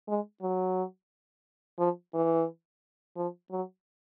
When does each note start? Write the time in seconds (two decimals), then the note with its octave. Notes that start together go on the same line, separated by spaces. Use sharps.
0.09 G#3
0.42 F#3
1.79 F3
2.14 E3
3.17 F3
3.51 F#3